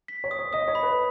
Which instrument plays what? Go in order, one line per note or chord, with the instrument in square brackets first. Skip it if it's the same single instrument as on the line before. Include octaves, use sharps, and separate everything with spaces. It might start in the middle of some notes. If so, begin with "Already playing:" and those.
[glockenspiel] B6
[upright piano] C#5
[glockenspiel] D#6
[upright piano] C#5
[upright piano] D#5 [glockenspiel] D#6
[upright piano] C#5
[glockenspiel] B5
[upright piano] B4